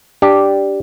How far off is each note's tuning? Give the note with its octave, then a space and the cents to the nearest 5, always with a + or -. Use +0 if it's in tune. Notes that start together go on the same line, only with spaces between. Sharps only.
D4 +0 G4 +0